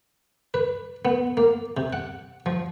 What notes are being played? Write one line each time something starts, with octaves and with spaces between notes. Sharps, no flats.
B4
B3
A#3
C3
F#5
F3